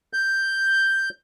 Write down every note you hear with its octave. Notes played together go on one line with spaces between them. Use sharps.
G6